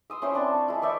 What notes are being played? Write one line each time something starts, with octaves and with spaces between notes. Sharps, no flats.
C6 D#6 E6
C#4 E4 C5 G5
C4 D4 A5
C#6
G#3 E4
C#5 D5 E5 G5